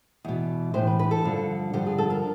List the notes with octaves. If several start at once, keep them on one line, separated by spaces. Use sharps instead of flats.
E2 B2
A2 E3 C5
B4
B4
A4
G2 D3 F3
G2 D3 F3 G4
G#4
A4
A#4